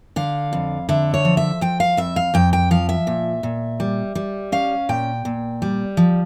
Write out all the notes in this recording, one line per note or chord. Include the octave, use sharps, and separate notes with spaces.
D3 F5
F2
D3 E5
C#5
F3
E5
F3 G5
F5
F2 E5
F5
F2 G5
G5
F3 F5
E5
A#2
A#2
G3
G3
C#4 F5
A#2 G5
A#2
G3
F3